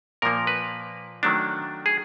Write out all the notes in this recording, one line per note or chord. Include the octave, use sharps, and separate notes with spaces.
A#2 F3 A#3 A#4
B4
D#3 F#3 A3 D4
G#4